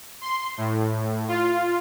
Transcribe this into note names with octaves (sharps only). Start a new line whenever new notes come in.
C6
A2
F4